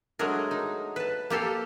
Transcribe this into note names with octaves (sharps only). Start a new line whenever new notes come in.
F#3 G#3 A3 D4 G#4 A#4
D#4
B4 A5
A#3 G4 A4 F5